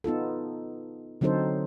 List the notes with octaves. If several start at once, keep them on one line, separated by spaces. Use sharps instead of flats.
B3 D#4 F4 A4
D3 F#3 C4 D#4 A4 C5